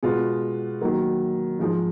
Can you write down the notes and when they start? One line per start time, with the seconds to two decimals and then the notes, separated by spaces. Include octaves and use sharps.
0.03 B2 G#3 B3 F4
0.81 D#3 F#3 A#3
1.59 G#2 F3 G#3